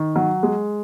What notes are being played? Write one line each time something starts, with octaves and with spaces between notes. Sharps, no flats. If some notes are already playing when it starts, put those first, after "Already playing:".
Already playing: D#3
F#3
G#3